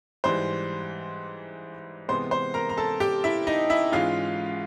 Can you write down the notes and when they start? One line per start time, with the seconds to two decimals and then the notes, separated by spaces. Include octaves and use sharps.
0.24 G#2 E3 G3 C5 C6
2.08 C3 E3 G#3 B3 C5 C6
2.31 C5 C6
2.54 A#4 A#5
2.70 A#5
2.77 A4 A5
3.00 G4 G5
3.24 E4 E5
3.47 D#4 D#5
3.70 E4 E5
3.92 G#2 E3 G#3 C#4 F4 F5